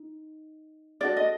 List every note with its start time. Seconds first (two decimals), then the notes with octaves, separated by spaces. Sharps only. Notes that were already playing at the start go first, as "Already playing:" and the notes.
Already playing: D#4
1.00 D4 F#4 A4 D5
1.17 D#5